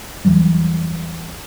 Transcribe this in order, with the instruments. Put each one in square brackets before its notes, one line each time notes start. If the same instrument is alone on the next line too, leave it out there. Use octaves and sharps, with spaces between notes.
[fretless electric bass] E2 E3 F#3 G3